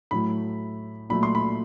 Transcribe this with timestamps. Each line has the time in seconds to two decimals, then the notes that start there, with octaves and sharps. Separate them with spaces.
0.11 A2 F#3 A3 B5
1.10 A#2 F#3 A3 B5
1.23 C6
1.35 B5